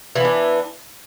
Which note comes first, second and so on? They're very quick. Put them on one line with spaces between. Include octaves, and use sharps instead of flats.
E3 B3 D4